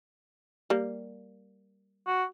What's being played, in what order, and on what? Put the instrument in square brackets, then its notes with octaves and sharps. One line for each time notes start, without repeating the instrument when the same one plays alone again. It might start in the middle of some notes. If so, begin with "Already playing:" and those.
[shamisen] G3 A#3
[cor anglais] F#4